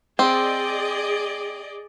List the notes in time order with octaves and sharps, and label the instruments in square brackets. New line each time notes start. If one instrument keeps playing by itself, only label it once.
[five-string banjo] C4 [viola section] G#4 D5 D#5